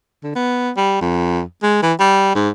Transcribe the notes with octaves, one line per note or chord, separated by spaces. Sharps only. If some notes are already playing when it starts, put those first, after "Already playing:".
D3
B3
G3
F2
G#3
E3
G3
G#2